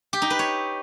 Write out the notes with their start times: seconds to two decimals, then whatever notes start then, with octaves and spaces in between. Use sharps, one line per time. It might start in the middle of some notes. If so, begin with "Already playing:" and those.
0.13 G4
0.22 D#4
0.30 B4
0.39 C#5